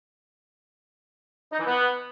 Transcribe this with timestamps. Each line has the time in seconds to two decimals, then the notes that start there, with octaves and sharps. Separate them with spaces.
1.52 D#4
1.59 E3
1.66 B3